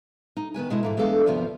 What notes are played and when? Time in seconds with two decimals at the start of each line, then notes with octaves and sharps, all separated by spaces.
0.37 D#4
0.54 D#3 B3 B4 G#5
0.70 B2 G#3 A3 E4
0.83 G#2 E3 A#3
0.97 E3 G#3 B3 D4 A4 F5
1.26 D2 G2 C3 F3 B3 A#4